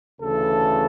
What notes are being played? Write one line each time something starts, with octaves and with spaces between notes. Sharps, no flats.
D2 C#3 E3 A4